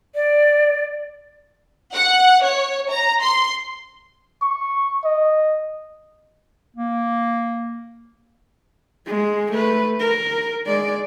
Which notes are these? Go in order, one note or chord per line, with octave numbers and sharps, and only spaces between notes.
D5
F#5
C#5
A#5
C6
C#6
D#5
A#3
G#3
A3 B4
A#4
G#3 D5